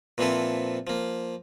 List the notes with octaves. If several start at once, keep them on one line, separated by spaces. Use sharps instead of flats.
A#2 E3 F3 C4 E4 A4
F3 A#3